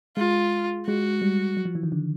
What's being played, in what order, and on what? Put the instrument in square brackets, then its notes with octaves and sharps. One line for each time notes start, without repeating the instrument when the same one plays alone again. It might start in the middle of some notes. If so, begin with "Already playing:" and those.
[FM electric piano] G#3 [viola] F4
[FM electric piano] G#3 [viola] F#4
[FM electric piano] G3
F#3
F3
E3
D#3
D3